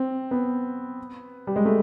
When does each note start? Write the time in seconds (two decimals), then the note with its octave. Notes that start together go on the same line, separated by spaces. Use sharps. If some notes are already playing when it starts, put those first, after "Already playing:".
Already playing: C4
0.31 B3
1.47 G3
1.56 G#3
1.65 A3